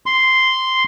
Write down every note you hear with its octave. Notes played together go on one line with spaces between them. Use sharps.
C6